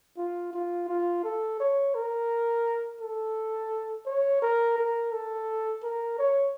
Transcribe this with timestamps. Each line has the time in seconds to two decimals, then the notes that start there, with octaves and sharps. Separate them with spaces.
0.18 F4
0.53 F4
0.89 F4
1.24 A4
1.60 C#5
1.95 A#4
3.01 A4
4.06 C#5
4.42 A#4
4.78 A#4
5.12 A4
5.83 A#4
6.19 C#5